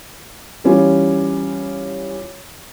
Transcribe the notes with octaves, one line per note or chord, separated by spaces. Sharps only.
E3 G3 C#4 F4